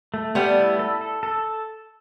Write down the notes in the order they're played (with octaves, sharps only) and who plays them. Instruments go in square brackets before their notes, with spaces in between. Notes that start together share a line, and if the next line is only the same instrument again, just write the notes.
[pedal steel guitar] A3
[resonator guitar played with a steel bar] G3 B3 [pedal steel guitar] A3
[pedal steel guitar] E4
A4
A4
A4